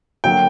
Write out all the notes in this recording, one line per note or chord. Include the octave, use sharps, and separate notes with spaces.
D3 F#3 A#3 G5